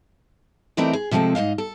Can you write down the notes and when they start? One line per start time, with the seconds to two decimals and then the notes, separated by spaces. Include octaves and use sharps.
0.77 E3 A3 C4 D#4 A#4 D5
0.93 G#4
1.11 C3 F3 G#3 C4 A4
1.35 G#2 F#3 D#5 F5
1.58 A4